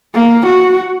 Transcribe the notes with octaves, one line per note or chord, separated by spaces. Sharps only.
A#3
F#4